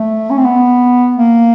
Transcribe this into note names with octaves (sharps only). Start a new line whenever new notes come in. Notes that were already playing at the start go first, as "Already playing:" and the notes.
Already playing: A3
C#4
C4
B3
A#3